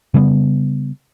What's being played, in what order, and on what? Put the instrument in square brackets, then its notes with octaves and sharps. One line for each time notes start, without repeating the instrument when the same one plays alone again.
[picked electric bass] C#3 G3 A3 B3